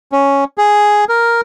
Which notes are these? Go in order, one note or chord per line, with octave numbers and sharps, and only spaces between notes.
C#4
G#4
A#4